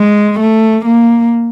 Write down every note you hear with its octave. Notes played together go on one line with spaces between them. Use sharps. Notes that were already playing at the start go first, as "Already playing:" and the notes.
Already playing: G#3
A3
A#3